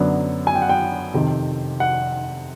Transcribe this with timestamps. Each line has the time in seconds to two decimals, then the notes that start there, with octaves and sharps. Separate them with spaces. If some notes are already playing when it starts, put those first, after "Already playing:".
Already playing: F#2 D3 F#3 B3 D4
0.47 G#5
0.55 G5
0.62 F#5
0.69 G5
1.14 F2 C3 D#3
1.80 F#5